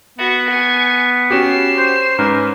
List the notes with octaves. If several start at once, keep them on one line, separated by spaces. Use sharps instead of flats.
B3 F#4 C#6
G#5 C#6
C#4 F#4 G4 C7 E7
C5
G#2 C#4 A#4 B4